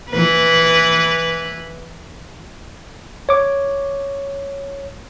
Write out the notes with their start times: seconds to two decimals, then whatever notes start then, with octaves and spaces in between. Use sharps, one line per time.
0.10 E3 B4
3.29 C#5 D6